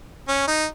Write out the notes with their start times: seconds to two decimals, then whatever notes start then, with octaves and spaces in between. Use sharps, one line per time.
0.28 C#4
0.48 D#4